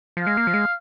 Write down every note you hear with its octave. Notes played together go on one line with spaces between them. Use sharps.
F3 F5
G#3
A#3
F3
G#3